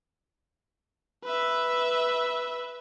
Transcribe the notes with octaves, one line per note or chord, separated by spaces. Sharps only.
B4 E5